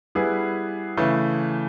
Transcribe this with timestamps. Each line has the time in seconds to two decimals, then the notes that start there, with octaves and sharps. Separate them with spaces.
0.15 G3 B3 E4 G#4 B4
0.97 C#3 E3 A3